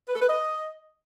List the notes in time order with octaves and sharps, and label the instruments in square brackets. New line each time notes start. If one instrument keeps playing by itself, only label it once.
[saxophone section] B4
A4
B4
D#5